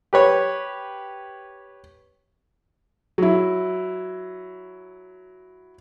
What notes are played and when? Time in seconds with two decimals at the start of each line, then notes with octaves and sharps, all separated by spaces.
0.13 G4 B4 C#5
3.18 F#3 E4